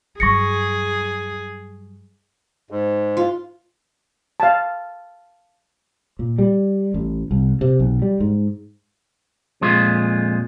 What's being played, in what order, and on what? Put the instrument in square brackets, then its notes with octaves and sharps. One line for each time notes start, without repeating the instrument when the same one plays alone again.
[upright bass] G2 F#3 [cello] G#4 [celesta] C#6 A#6 C#7
[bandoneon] G#2
[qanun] F4
[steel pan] F5 A5
[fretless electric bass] A#2
G3
A1
C2
C3
B1
G3
G#2
[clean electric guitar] F2 A#2 G#3 F4